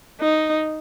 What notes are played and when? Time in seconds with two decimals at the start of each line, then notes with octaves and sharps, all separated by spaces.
0.21 D#4